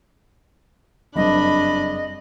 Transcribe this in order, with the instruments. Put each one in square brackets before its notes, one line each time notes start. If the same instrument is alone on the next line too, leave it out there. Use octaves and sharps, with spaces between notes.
[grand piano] F#1 G2 C4 [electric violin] D4 B5 [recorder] D#5